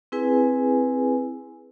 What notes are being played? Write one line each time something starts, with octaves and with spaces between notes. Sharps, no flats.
C4 E4 G#4 B4 G#5